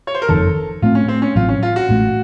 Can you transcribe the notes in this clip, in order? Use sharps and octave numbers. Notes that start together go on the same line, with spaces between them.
C#5
C5
A#4
F#1 F2 D#3 A4
A2 A3 C4 F4
C#4
C4
C#4
A1 A2 F#3 C4 F4
C#4
F4
F#4
A1 A2 A3 C#4